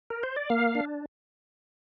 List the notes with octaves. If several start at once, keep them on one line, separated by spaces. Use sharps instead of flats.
A#4
C5
D5
A#3 F5
D4